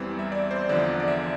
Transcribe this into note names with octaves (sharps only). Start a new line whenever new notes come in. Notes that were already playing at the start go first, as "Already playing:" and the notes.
Already playing: E2 E3 G3 C4
E5
D5
C5
E2 D3 F3 D5
D5
E5